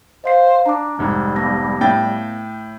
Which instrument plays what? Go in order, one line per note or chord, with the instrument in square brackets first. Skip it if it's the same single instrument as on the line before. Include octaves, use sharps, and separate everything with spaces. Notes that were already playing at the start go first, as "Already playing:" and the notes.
[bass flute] C5 [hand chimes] D#5 F5 C7
[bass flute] D4 [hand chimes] A#5 D6
[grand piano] F1 G#2 [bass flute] G3
[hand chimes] B3 A5 A#6
[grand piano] A2 G5 A6